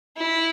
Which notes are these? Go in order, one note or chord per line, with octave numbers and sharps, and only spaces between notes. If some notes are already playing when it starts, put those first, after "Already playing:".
E4